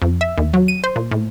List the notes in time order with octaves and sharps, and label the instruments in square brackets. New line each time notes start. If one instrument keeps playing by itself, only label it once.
[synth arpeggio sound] F2
E5
D#2
F#3
D#7
C5
A#2
A2